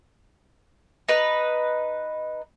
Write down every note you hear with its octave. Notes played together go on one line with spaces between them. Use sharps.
D#4 B4